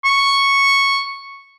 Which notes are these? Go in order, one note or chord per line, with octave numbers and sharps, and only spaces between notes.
C#6